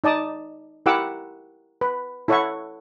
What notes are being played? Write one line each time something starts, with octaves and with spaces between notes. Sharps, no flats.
D#4 D5 A5 D#6
E4 G4 A#4 F#5 D6 E6
B4
E4 A4 C#5 E5 F#5 C#6